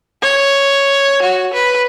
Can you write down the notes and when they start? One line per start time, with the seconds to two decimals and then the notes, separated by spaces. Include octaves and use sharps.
0.22 C#5
1.22 F#4
1.53 B4